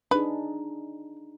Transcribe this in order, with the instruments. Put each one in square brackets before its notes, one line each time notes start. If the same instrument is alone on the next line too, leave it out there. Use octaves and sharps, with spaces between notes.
[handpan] D4 D#4 G#4 [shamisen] B4